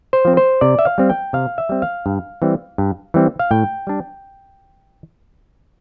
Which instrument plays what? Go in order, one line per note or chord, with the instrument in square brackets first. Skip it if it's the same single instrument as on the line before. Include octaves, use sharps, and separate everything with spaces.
[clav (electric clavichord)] C5
F3 C4
C5
C3 D5
E5
F5
G3 C4
G5
C3 F5
E5
G3 C4
F5
G2
E3 G3 C4
G2
E3 G3 C4
F5
A2 G5
G3 D4